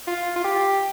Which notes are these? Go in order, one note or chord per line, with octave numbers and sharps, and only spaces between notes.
F4
F4
G4